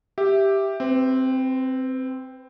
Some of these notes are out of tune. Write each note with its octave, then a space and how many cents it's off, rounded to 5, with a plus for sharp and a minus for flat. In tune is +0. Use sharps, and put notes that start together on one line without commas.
G4 +0 E5 +0
C4 +0 B4 +35